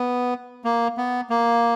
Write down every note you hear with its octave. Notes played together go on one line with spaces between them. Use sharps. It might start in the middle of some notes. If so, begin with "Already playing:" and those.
Already playing: B3
A#3
B3
A#3